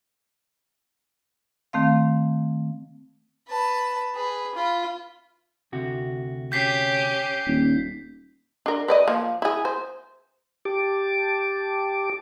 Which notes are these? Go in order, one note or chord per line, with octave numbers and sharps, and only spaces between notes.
D#3 A3 C4 F5
B4 A5
G#4 B4
F4 B5
D2 C3 F#4
C#4 G4 G6 B6 C7
D#1
D4 A#4
B4 D5 D#5
F3 A#3
E4 G#4
C5
G4 A5 D6